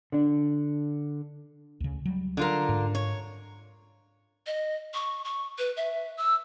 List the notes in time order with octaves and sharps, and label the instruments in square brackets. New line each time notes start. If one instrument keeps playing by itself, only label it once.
[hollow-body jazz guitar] D3 D4
[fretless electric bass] D2 C#3
F#3 G3
[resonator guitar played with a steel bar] D3 F4 A#4
[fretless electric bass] G#2
[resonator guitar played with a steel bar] C#5
[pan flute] D#5
C#6
C#6
B4
E5
E6